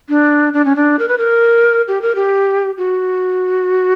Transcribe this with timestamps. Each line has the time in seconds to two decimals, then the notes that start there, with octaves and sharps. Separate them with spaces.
0.09 D4
0.54 D4
0.65 C#4
0.76 D4
0.99 A#4
1.08 B4
1.18 A#4
1.88 G4
2.02 A#4
2.15 G4
2.78 F#4